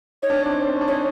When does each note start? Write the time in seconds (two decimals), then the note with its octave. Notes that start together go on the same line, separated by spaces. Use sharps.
0.23 D#4 C#5
0.30 D4
0.38 C#4
0.46 C4 D4
0.67 C4
0.74 C#4
0.81 D4
0.88 C#4 D#4 C#5